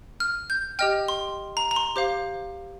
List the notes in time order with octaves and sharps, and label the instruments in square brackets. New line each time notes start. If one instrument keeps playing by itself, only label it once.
[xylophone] F6
G6
G4 D#5 G5 F6
C6
A#5
A#5
C6
G4 C5 F5